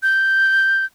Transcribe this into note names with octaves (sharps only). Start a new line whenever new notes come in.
G6